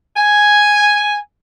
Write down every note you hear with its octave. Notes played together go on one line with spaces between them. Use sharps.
G#5